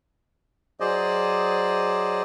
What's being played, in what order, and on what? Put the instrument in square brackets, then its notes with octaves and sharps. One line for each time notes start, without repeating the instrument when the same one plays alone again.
[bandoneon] F#3 G#4 C5 D5 D#5